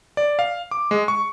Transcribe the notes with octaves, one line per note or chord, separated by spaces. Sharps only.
D5
F5
D6
G#3
C#6